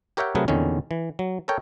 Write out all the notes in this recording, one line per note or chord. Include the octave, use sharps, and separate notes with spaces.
G4 A#4 C#5 E5 F#5 G5
C3 F#3 A3 G#4 A#4 B4
E2 A#2 D3 D#3 C#4
E3
F#3
A4 A#4 C#5 G5